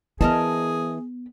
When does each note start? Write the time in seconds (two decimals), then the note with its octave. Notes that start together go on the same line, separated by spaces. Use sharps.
0.21 E3 B3 G#4 A#4 D#5 A5